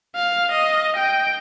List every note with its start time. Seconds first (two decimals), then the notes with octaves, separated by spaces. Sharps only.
0.15 F5
0.51 D#5
0.96 G5